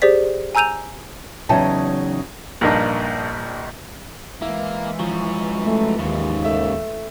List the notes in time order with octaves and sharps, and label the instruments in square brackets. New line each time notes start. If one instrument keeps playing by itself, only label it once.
[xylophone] G4 G#4 C5 D5 B6
G#5 A#5 E6 G6 D#7 F7
[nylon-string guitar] E2 C#3 F#3 D#4 G5 A5
[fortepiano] A#1 G2 A#3 D4 D#4 A5
[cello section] E3 G#3 [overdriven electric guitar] A#3 [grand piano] E4
[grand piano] F3 [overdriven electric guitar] F#3 C#4
[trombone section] A3
[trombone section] D#2 [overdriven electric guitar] G#2 C#3
[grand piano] A3 E5